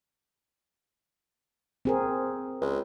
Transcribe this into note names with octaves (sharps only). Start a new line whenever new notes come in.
C4 G#4 A#4
C#2